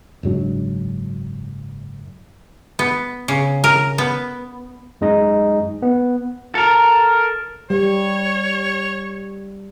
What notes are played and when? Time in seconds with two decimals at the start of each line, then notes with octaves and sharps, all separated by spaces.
0.23 F#1 G#2 F#3 D4
2.79 B3
3.28 C#3
3.64 A#4
3.98 B3
5.01 F#2 G#3 D#4 D#5
5.82 B3
6.55 A4 A#4
7.70 G3 C#5